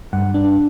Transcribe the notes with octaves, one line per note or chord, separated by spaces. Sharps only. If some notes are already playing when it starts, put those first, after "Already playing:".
G2 F#5
D4